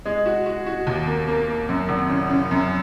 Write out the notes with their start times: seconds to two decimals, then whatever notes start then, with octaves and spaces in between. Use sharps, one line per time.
0.05 G#3
0.26 F#4
0.46 F#4
0.66 F#4
0.87 D#2
1.07 A#3
1.28 A#3
1.48 A#3
1.69 F#2
1.89 G#1
2.10 C#3
2.30 C#3
2.51 F#2